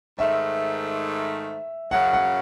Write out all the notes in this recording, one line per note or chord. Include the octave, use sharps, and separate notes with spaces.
G#2 D#3 A3 E5
F#2 C#3 F#3 F#5
F#5